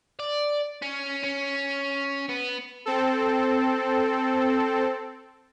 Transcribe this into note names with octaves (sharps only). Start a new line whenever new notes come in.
D5
C#4
C#4
B3
C4 A4